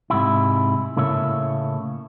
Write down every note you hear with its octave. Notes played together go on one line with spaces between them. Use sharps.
G#2 C3 E4
A2 C#3 A#3 C#5 E5